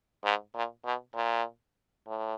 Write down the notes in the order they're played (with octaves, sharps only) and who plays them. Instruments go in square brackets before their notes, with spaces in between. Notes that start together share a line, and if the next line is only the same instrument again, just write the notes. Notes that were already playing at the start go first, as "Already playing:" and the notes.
[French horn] G#2
A#2
B2
A#2
A2